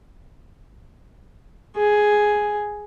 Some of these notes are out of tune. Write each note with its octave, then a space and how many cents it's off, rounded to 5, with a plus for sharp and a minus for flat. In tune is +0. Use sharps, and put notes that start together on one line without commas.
G#4 +5